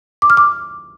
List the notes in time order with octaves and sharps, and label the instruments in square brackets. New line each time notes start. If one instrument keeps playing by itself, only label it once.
[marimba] D6
F6
D6